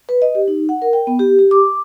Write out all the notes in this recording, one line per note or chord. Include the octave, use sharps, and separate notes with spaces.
B4
D#5
G4
D#4
F#5
A#4
G5
B3
G4
G4
D6